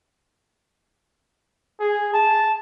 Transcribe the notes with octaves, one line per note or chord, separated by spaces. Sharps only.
G#4
A5